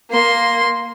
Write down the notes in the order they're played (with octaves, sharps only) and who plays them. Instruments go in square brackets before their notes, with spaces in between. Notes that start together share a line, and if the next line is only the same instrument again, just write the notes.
[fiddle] A#3 C6